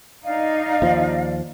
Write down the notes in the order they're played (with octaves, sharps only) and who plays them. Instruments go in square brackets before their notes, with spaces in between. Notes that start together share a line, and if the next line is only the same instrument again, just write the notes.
[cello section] D#4 [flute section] D5 F5
[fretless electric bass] D#2 F3